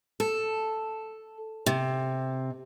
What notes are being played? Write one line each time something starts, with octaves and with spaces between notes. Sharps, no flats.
A4
C3